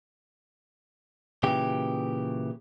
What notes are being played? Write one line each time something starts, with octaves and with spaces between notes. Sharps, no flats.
A#2 C#3 E3 G4